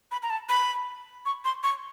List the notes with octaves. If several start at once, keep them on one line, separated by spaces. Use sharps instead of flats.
B5
A#5
A5
B5
C#6
C6
C#6